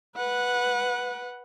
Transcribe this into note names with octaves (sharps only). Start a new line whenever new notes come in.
B4 F#5